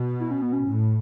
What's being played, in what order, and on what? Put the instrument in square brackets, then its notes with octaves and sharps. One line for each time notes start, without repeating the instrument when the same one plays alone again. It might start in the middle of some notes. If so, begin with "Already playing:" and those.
Already playing: [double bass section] B2
[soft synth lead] E4
C#4
B3
C#4
[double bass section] A2